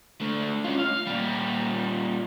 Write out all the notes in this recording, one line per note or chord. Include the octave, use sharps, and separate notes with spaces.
A3 D4
C#4 F4
F5
A#2 G3